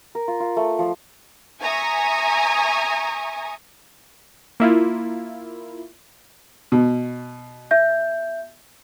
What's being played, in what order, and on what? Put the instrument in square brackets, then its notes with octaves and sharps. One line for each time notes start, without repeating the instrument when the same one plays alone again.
[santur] A#4
F4
F4
A3
F3
[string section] E5 G#5 A#5 C#6 D#6
[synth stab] A#3 E4 F4
[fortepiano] B2
[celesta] E5 G6